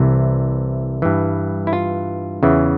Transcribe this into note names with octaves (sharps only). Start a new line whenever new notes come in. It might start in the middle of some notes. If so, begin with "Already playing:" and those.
Already playing: C2 C3 E3
G2 E3
E4
F4
E2 C#3 E3